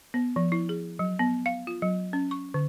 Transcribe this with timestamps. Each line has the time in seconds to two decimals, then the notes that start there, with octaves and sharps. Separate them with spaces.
0.14 B3
0.36 F3
0.52 E4
0.69 G#4
0.99 F#3
1.19 B3
1.46 F5
1.67 F4
1.82 F#3
2.13 C#4
2.31 C#6
2.54 D3